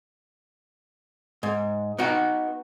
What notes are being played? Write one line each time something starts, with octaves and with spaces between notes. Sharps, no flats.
G#2
B3 D#4 F#4